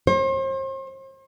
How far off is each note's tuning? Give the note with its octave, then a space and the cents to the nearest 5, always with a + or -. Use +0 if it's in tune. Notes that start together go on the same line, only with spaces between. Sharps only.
C5 +40